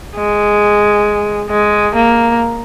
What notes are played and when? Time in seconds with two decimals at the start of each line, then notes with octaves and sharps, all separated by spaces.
0.16 G#3
1.50 G#3
1.95 A#3